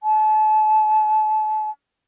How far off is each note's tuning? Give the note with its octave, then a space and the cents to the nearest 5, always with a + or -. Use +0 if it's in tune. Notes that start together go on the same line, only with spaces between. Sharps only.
A5 -35